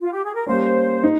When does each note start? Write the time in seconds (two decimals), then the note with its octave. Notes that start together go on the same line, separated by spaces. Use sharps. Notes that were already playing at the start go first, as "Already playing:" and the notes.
0.01 F4
0.13 G4
0.24 G#4
0.35 A#4
0.47 G3 A#3 C#4 C5
1.03 D#4